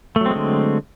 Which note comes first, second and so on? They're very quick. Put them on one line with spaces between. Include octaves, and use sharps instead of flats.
A3 F#3 C4 G#3 D3